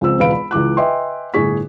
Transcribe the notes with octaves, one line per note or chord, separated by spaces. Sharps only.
C#2 F3 C4 E6
E1 C#2 B4 F5 B5 D7
B5
C#2 E3 D6 F#6
B4 D#5 E5 G5 G#5 C6
G1 A2 E4 G#4 C#6 B6